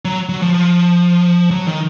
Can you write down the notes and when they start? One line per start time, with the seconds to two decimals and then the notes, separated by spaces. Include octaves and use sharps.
0.05 F#3
0.29 F#3
0.42 F3
0.54 F3
1.51 F#3
1.68 D#3